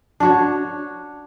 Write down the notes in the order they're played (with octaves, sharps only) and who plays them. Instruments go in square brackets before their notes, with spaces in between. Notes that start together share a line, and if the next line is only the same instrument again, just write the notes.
[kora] D4 F#4 C#5